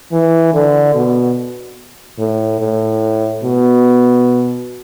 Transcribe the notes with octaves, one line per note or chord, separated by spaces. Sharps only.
E3
D3
B2
A2
A2
B2